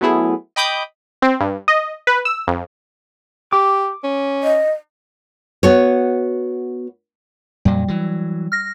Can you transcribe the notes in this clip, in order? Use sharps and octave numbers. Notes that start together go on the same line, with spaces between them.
F#3 A3 B3 E4 G#4
D#5 G5 B5 D6 D#6 G6
C4
G2
D#5
B4
E6
F2
G4 D6
C#4
D#5
B3 F#4 C#5
F2 A#2 F#3 G3
E3 F#3
F6 A#6